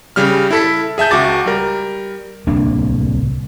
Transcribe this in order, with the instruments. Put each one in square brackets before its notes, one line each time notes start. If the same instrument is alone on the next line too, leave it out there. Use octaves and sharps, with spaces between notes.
[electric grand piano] C#3 G3 F6
E4 A4 B6
G#4 E5 A5 G6
C#2 F#4 D6 A6
G3 A#4
[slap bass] D1 C2 A#3 D4